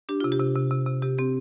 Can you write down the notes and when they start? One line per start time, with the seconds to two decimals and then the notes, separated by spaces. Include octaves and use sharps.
0.09 D4 G4
0.20 C3 F4
0.32 G4
0.40 C3
0.56 C3
0.71 C3
0.87 C3
1.02 C3 G4
1.18 C4 G4